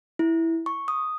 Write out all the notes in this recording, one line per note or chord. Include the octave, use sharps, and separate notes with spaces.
E4
C#6
D#6